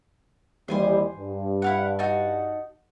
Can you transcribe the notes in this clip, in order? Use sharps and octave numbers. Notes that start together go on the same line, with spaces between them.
D#2 E3 G3 C5 G#5 C6
G2
E4 F5 F#5
D#4 F#4 A5